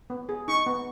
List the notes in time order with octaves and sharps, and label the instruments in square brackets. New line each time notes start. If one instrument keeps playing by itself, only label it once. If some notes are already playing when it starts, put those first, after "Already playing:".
[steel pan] B3
G#4
[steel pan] D#4 [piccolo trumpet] C#6
[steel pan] B3